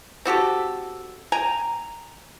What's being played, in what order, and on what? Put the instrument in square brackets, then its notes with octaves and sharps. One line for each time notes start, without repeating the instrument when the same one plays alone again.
[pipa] C4 F#4 G4 A4
G5 G#5 A#5